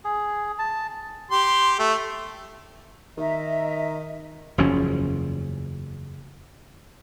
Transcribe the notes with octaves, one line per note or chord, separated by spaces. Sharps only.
G#4
A5
G4 C6
A3
D#3 D#5 E5 A#5
F#1 E2 F3 C#4